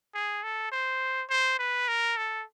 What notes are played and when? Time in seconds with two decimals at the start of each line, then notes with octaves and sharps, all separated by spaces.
0.14 G#4
0.43 A4
0.72 C5
1.29 C5
1.59 B4
1.88 A#4
2.17 A4